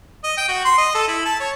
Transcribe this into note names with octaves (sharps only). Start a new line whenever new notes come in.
D#5
G5
F#4
C6
D#5
A4
E4
A5
C#5